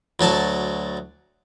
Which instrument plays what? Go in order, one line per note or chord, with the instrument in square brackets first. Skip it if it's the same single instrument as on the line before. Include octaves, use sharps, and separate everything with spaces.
[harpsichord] D2 F#3 D5 A5